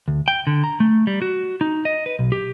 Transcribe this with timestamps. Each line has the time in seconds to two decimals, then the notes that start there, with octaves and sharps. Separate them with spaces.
0.08 D2
0.28 G5
0.47 D3
0.64 A#5
0.80 A3
1.07 G3
1.22 F#4
1.61 D#4
1.85 D#5
2.06 B4
2.19 B1
2.32 G4